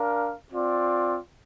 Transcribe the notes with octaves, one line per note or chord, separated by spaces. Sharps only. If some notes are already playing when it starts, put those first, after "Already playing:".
Already playing: D4 A#4 F5
C4 F4 D5